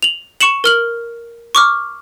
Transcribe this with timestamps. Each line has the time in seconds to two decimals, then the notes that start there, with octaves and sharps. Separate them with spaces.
0.03 F7 F#7
0.41 C#6 C#7 E7 F#7
0.64 A#4 F6 F#7
1.55 C#6 D6 F6